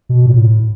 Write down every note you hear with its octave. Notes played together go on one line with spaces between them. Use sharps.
B2
A2